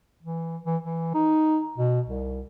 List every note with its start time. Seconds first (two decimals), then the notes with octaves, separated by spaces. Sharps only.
0.23 E3
0.66 E3
0.83 E3
1.14 D#4
1.78 B2
2.06 C2